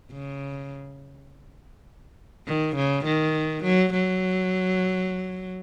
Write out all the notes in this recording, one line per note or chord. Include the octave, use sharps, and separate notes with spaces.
C#3
D#3
C#3
D#3
F#3
F#3